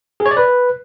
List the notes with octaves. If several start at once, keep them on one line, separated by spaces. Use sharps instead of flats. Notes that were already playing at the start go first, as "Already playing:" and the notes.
G#4
C#5
D5
B4